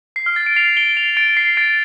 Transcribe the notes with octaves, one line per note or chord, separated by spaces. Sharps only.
C7
F6
A6
A6 D7
C7 F7
D7 G7
C7 F7
A6 D7
C7
A6 D7